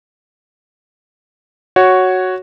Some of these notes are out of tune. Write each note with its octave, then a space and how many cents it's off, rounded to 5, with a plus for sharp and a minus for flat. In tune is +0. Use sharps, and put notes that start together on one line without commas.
F#4 +0 C#5 +0